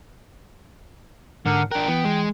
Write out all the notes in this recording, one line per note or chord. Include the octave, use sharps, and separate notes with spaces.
G#2 D3 A#4 F#5
D4 A#4 G5 F#6
E3 B3
G#3